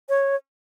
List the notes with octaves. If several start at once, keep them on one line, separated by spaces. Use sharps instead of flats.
C#5